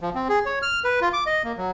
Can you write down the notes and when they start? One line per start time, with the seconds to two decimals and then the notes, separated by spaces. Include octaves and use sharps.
0.01 F3
0.15 C4
0.29 G#4
0.46 C#5
0.62 F6
0.84 B4
1.01 F4
1.13 D6
1.27 D#5
1.44 A#3
1.57 F#3